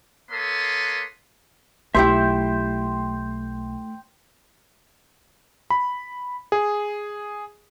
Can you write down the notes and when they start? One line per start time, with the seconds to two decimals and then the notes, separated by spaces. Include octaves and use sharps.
0.31 A#3 A4 B4 C#5 C6 D#6
1.95 B1 A3 E4 G4 C5 E5 G5
5.70 B5
6.52 G#4